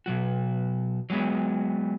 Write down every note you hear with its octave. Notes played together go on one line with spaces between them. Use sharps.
B2 F#3 F#4
F#3 G#3 B3 G#4